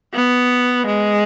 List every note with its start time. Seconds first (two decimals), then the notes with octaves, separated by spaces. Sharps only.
0.14 B3
0.87 G#3